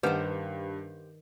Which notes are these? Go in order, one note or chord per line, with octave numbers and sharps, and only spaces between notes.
G2 D#3 G4 B4 C5 F#5 A5